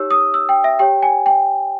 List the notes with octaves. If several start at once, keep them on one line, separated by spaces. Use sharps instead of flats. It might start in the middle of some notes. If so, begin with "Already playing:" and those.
Already playing: D#4 G4 C#5 E6
D#6
E6
G5
E5
G4 C#5 G5
G#5
G5